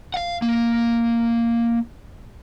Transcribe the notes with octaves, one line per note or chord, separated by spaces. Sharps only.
F5 F#5
A#3